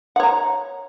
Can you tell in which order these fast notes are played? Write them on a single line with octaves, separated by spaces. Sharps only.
F#5 C#5 A#5